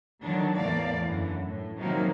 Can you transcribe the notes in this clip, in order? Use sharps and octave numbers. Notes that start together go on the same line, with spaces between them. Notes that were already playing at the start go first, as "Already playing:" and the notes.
D3 D#3 F#3 D4
E2 A2 A3 A#3 D5 F5
F#2 D3 E3
A2
C3 D#3 F3 F#3 A#3